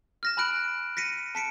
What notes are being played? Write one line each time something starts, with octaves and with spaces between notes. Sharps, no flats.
F6 A#6 E7
G#5 B5 F6 F#6 D7 F#7
A#6 B6 C#7 D#7
A5 B6 C#7 D7